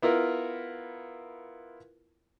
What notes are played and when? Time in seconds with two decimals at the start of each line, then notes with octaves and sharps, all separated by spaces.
0.02 B3 E4 F4 A#4